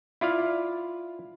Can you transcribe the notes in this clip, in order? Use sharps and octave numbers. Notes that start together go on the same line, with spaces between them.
E4 F4 D5 F5